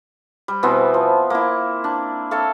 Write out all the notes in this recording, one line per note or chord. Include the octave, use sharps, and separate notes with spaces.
G3
B2 E3 B3 C4
F3
A#3 E4
D4
A4 C#5 E5 F5